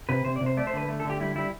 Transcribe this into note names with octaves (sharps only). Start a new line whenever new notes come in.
C3 B4
C3 C5
D5
C3
C5
A3 D5
C5
D3 B4
A3
A4
D3 G4
G3 E4
G3 E4